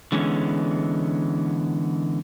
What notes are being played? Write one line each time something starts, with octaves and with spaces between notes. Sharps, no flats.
D3 E3 G#3 B3 C#4